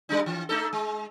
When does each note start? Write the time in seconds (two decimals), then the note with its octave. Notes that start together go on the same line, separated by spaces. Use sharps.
0.09 G3 D4 D#4
0.26 E3
0.49 A3 D#4 A4
0.73 G#3